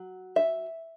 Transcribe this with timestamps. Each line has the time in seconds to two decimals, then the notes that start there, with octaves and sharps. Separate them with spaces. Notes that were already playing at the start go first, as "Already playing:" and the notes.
Already playing: F#3
0.36 E5